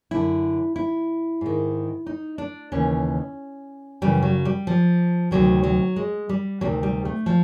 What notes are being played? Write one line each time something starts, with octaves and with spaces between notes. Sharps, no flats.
F#2 D3 E4
E4
G#2 D#3
D#4
D4
D#2 C#3 E3 C#4
F#2 C#3 E3 G3
F#3
G3
F3
D2 C3 D#3 F#3
F#3
G#3
G3
D2 C3 D#3 F#3
G3
A3
F3